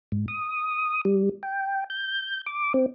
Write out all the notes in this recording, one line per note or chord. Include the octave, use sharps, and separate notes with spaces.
G#2
D#6
G3
G5
G6
D6
C4